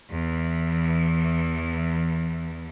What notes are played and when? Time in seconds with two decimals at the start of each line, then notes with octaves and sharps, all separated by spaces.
0.11 E2 E3